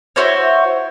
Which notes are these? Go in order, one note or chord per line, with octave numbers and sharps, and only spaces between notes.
E4 F#4 C5 C#5